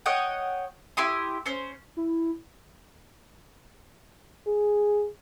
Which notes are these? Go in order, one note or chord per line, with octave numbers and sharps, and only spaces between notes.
C#5 D#5 F#5 G5
E4 G4 C6 D#6
C#4 C5
E4
G#4